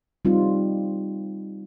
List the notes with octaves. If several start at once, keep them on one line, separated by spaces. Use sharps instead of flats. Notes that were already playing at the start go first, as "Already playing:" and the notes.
G3 C4 D#4 F4